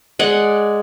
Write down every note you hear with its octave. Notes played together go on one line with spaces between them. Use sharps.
G#3 D5 F#5